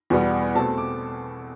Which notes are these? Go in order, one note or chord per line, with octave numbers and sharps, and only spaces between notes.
E2 B2 G3 B3
B2 A3 C4 A5
D6